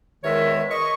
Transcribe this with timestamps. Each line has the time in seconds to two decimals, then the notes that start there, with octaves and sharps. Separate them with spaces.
0.24 E2 D#3 G#3 A#4 C#5 E5
0.71 D#5 C#6